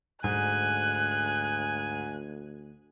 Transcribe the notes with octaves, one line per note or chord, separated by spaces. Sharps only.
D2 G#2 G#5 F#6